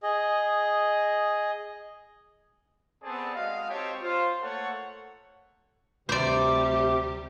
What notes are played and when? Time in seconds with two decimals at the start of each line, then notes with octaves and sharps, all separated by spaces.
0.03 G#4 D#5
3.03 B3 C4 G#4 A4 D5 A5
3.35 G#3 F#4 D#5 F5
3.70 C4 D#4 G4 C#5 G5 A5
4.01 F4 C5
4.42 A3 A#3 A4 C#5 F#5
6.09 D2 C3 G3 G4 C5 D5 D6